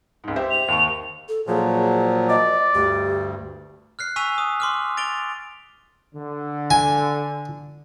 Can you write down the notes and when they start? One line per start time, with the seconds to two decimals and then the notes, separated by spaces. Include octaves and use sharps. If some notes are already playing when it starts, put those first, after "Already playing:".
0.24 C#2 G#2
0.36 G4 C5 E5
0.50 F7
0.68 D#2 D#4 C#6
1.29 A4
1.47 A#2 F3 F#3 G#4
2.29 D5 D#5
2.75 D2 G2 G4
3.99 F6 F#6 C7
4.16 G#5 C#6 E6 B6 D#7 F7
4.38 D#6
4.60 C6 D6 F6
4.97 A6 D7 F7 G7
6.15 D3
6.71 G#5